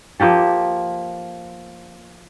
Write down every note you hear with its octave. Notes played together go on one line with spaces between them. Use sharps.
F3 A#3 G4 A4